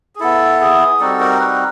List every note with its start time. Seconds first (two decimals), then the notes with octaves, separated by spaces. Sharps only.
0.15 G#4
0.20 B3 E4 A4
0.60 G#4
1.00 G3 C4 D#4 F#4 A4
1.21 A#4
1.40 B4